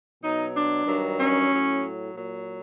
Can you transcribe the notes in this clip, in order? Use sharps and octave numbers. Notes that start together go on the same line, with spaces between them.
B2 F#3 D#4
D4
G2 D#3 F#3
C#4
A2 F#3
A#2 F#3